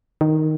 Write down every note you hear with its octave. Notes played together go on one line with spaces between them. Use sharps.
D#3